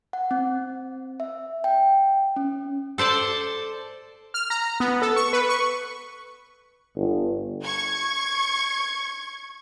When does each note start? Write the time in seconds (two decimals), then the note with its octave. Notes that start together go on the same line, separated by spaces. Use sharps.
0.13 F#5
0.31 C4
1.20 E5
1.64 G5
2.36 C#4
2.98 A4 C5 D5 A5
4.34 F6
4.50 A#5
4.80 B3
5.02 A4
5.16 C#6
5.33 B4
5.49 C#6
6.96 G1
7.63 C#6 G#6